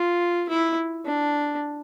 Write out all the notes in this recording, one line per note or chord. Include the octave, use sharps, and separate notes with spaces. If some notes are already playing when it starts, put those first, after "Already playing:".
Already playing: F4
E4
D4